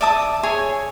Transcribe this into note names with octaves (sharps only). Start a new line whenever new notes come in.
D5 E5 A5 D#6
G#4 C#5 G#5